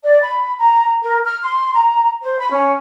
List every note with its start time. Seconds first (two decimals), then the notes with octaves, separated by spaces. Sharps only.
0.03 D5
0.22 B5
0.59 A#5
1.02 A#4
1.24 F6
1.42 C6
1.73 A#5
2.23 C5
2.39 B5
2.52 C#4